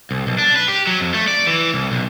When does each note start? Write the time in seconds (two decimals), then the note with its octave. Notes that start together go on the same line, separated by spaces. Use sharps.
0.11 C2
0.27 B1
0.39 D4
0.56 B4
0.68 G4
0.87 F#3
1.00 F2
1.14 A3
1.28 D5
1.47 E3
1.74 C2
1.92 B1